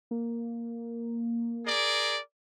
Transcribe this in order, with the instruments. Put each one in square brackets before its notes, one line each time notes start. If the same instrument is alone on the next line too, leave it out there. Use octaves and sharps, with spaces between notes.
[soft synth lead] A#3
[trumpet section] G#4 A#4 D5